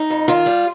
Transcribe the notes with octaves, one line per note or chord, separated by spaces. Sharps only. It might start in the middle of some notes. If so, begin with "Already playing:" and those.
Already playing: D#4
F2
D#3 F4
G3